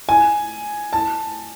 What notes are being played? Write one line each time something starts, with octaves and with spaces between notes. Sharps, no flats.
G#5
A5